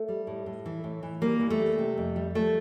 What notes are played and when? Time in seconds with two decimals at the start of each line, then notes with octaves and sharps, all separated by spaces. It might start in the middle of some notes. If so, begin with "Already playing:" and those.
Already playing: A3
0.08 G3
0.27 A2
0.46 A2
0.66 E3
0.84 A2
1.03 E3
1.22 G3 A#3
1.40 E3
1.50 A3
1.60 G3
1.79 C3
1.97 F2
2.16 G3
2.35 F3 A3